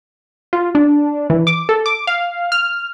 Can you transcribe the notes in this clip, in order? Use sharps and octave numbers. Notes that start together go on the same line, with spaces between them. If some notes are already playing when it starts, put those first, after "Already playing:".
F4
D4
E3
D6
A4
D6
F5
F6